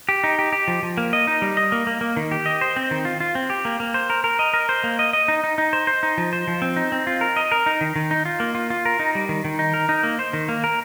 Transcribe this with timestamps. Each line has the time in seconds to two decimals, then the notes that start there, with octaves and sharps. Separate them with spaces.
0.09 G4
0.24 D#4
0.39 G4
0.53 G4
0.68 F3
0.83 F3
0.97 A#3
1.13 D#5
1.27 D#4
1.42 G3
1.57 D#5
1.72 A#3
1.87 A#3
2.01 A#3
2.17 D#3
2.31 G4
2.46 D#5
2.61 C5
2.76 C4
2.91 D#3
3.05 F4
3.20 F4
3.35 C4
3.50 G4
3.65 A#3
3.80 A#3
3.94 C5
4.10 A#4
4.24 A#4
4.39 D#5
4.53 A#4
4.69 C5
4.84 A#3
4.99 D#5
5.13 D#5
5.28 D#4
5.44 D#4
5.58 D#4
5.73 C5
5.87 C5
6.03 D#4
6.18 F3
6.33 C5
6.48 F3
6.62 C4
6.76 D#4
6.92 C4
7.07 F4
7.21 A#4
7.36 D#5
7.52 A#4
7.66 D#4
7.81 D#3
7.96 D#3
8.11 D#4
8.25 F4
8.40 A#3
8.55 F4
8.70 F4
8.85 A#4
9.00 D#4
9.15 G3
9.29 D#3
9.45 D#3
9.59 D#4
9.74 A#4
9.89 D#4
10.03 A#3
10.19 C5
10.33 D#3
10.49 A#3
10.64 A#4